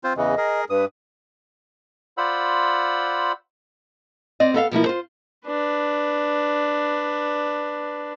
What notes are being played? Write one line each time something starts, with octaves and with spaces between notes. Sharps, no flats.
C4 F4 C5
E2 C#3 E3 D#5
G#4 A#4
G2 B4 D#6
F4 C5 D5 F#5 B5 E6
C4 D5 D#5
B3 A4 E5 F5
B2 F3 A#3 E4
F4 C5
D4 B4